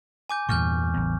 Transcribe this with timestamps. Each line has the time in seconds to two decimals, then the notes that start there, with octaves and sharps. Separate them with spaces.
0.29 G#5 D6 G6
0.49 E2 G2 A#2 C#6 F6 G6
0.94 A1 E2